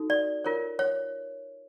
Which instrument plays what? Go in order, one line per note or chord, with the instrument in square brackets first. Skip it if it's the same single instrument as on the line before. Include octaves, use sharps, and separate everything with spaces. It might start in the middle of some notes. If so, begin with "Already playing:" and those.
Already playing: [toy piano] D#4 F#4 A4
D5
F4 A#4 C#5
C#5